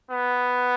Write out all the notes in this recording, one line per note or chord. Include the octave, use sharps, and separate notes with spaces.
B3